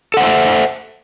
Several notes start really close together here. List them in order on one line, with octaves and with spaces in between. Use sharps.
A4 F#5 C5 E5